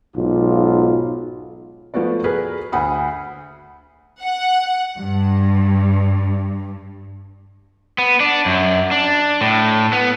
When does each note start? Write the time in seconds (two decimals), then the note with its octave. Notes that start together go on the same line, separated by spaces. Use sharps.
0.17 B1 G#2 F4
1.94 F3 A3 B3 F#4 D5
2.24 G#4 A#4 B4
2.72 D2 F#5 B5 D#6
4.21 F#5
4.99 G2
7.98 B3
8.20 D4
8.46 F#2
8.91 D4
9.41 A2
9.93 B3